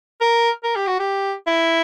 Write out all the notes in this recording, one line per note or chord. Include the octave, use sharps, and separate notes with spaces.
A#4
A#4
G4
F#4
G4
E4